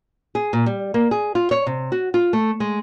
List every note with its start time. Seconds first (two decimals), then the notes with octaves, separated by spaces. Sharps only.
0.35 G#4
0.53 A#2
0.66 G3
0.94 A#3
1.11 G#4
1.35 F4
1.51 C#5
1.66 C3
1.92 F#4
2.14 F4
2.33 A3
2.60 G#3